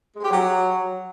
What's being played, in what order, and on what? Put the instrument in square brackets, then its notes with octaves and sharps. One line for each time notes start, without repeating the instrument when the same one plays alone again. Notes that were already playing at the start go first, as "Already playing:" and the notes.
[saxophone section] G#3
G4
F#3